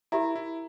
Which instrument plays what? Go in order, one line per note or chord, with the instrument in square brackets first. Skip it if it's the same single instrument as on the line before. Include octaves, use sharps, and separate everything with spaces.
[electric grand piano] E4 [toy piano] G4 A#4 E5 A#5
[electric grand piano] E4